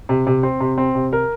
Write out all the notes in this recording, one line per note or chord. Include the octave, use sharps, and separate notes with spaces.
C3
C3
C4
C3
C4
C3
A#4